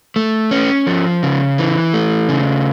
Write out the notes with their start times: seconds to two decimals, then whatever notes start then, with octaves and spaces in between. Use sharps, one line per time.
0.16 A3
0.51 C#4
0.87 F3
1.23 C#3
1.58 E3
1.94 A3
2.29 C#3